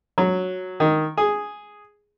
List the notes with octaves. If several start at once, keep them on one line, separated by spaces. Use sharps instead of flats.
F#3
D#3
G#4